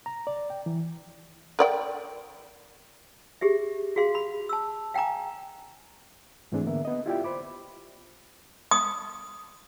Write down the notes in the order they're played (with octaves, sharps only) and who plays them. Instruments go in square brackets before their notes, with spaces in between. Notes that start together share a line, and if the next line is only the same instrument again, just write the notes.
[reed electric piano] A#5
D5
G5
E3
[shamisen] A#4 D5 G5
[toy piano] G4 G#4 E5
F#4 G#4 F5 C6
B5
A5 E6
F5 G5 G#5 A#5 D6
[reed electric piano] G#2 E3 A3 C4 D4 G#4
D3 A#3 B3 A#4 E5
B3 D#5
E4 F4 G4 D5 E5 G5
C5 B5 D6
[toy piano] D#6